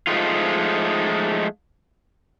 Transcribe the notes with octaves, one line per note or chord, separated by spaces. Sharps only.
F3 G#3 A3 D#4 F4